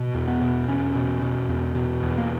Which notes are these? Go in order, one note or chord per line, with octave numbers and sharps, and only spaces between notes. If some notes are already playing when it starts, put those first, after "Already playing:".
Already playing: B2
E2
B3
B2
E2 C#4
B2
B2
E2
B2
E2
A#3